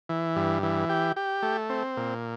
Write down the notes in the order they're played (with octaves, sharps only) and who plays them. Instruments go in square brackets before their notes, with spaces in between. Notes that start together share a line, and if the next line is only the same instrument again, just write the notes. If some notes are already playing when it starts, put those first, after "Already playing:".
[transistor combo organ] E3
G2
E3
G4
G4
A3
C4
A#2